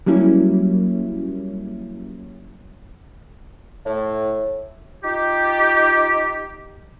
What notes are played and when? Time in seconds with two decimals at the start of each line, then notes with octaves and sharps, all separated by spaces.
0.06 F#3 G3 A#3 C#4 E4
3.85 A2
5.03 D#4 F4 G4